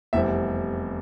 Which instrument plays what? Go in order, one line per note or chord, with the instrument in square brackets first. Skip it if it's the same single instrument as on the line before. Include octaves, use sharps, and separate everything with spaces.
[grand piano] F1 E2 E3 G3 C4 E5